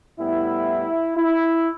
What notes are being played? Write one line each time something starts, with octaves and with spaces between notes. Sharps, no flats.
A2 G3 B3 E4
E4